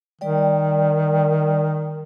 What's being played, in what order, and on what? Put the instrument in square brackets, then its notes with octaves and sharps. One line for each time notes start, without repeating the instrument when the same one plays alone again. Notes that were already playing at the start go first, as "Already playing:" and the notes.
[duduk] D#3 [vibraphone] G3 D5 G5